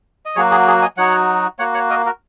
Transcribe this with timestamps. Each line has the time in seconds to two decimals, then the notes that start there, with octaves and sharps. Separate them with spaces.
0.26 D#5
0.36 F#3 A#3 F#4 G#4 C#5
0.51 G#4
0.67 G#4
0.82 D#5 G#5
0.97 F#3 D#4 F#4 C#5 F#5
1.59 A#3 F#4 C#5 F#5
1.74 C#5 F#5
1.90 A#4 D#5
2.06 F#4 A#4